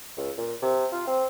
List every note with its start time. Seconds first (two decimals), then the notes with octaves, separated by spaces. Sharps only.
0.17 C#2
0.38 A#2
0.62 C3
0.92 F4
1.07 C4